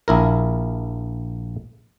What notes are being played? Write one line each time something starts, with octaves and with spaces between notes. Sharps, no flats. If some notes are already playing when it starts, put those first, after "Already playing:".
A#1 E4 A#4